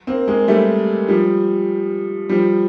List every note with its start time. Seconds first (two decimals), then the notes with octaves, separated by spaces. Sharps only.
0.07 A#3 C4
0.28 G#3 A#3
0.48 G3 A3
1.08 F3 G3
2.29 F3 G3